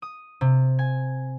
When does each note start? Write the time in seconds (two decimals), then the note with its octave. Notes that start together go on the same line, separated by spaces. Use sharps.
0.02 D#6
0.41 C3
0.79 G#5